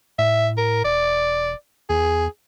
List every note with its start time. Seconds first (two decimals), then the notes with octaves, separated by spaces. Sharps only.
0.19 A2 E5
0.57 A#4
0.84 E1 D5
1.90 E2 G#4